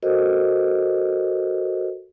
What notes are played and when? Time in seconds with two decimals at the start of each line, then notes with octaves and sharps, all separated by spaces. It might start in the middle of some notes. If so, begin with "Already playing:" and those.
0.02 F#4 A4 A#4 C5 D#5